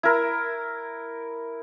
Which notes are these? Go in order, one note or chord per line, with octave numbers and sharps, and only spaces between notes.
E4 A#4